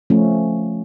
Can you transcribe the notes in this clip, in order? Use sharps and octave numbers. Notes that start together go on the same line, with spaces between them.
F3 A3 C#4